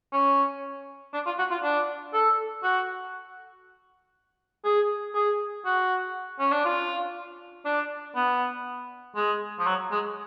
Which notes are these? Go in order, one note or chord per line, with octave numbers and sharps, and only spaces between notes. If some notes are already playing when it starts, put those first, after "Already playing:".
C#4
D4
F4
F#4
F4
D4
A4
F#4
G#4
G#4
F#4
C#4
D4
F4
D4
B3
G#3
F3
F#3
G#3